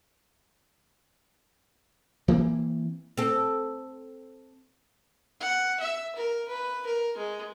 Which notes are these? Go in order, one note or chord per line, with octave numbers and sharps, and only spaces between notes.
E3 A#3 C4
C4 A4
F#5
E5
A#4
B4
A#4
G#3